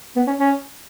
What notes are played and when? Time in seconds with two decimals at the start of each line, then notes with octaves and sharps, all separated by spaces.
0.16 B3
0.27 C#4
0.38 C#4